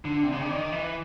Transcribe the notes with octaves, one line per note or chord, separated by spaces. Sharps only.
D3
C3
C#3
D3
D#3
E3